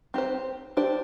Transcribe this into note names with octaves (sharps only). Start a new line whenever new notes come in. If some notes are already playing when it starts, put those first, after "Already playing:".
C4 G4 C5
D4 G4 C5